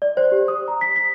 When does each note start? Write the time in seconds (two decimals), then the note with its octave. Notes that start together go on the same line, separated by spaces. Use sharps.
0.02 D5
0.17 C5
0.32 G4
0.48 D#6
0.68 A#5
0.81 B6
0.96 B6